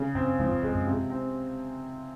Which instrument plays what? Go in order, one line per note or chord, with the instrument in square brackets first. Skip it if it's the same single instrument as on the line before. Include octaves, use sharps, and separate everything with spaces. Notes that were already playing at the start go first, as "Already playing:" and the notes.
Already playing: [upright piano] C#3
[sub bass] F#2 [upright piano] C4
[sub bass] F2 [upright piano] F3
[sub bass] F#2
[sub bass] F2 [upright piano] G#3
[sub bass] F#2
[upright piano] C3
C4